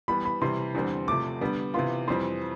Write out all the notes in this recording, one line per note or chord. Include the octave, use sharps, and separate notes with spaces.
E3 G3 B3 B5
B5
C3 E3 G3 C6
E2 D3 G3 C4
C3 F3 A3 D6
D3 G3 B3
C3 E3 B3 F4 C6
F2 E3 G3 C4 C6